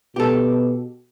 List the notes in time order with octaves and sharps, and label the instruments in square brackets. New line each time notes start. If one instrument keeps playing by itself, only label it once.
[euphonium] B2 [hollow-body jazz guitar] G4 A4